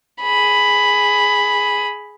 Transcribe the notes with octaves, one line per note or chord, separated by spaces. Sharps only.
G#4 B5